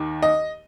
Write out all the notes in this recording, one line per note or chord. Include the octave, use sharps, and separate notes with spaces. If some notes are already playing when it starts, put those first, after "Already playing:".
Already playing: D#2 D#3
D#5